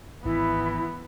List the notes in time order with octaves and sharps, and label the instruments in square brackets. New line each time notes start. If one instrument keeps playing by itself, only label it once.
[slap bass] G#1 [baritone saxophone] E3 [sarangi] B3 [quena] E4